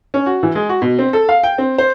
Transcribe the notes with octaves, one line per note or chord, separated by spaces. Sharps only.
C#4
F#4
E3
G#3
F#4
B2
C4
A4
F5
G5
C4
C5